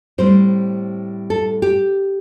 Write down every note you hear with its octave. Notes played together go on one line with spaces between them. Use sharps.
A2 G3 C4 C5
A4
G4